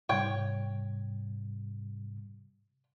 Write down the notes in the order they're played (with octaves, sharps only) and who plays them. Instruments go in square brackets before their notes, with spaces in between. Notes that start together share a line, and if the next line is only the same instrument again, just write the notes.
[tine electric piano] G#2 C3 G3 [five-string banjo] C#5 G5